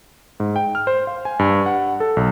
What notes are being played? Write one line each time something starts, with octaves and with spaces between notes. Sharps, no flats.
G#2
G5
F6
C5
F5
G#5
G2
F#5
A4
B1